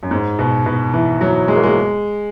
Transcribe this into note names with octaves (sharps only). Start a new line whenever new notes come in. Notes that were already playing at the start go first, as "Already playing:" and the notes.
F#2
G#2
B2
B2
E3
F#3
G#3
A#3
G#3